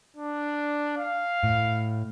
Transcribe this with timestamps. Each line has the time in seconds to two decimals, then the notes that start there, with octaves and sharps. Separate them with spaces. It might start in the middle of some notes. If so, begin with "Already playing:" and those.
0.17 D4
0.98 F5
1.44 A2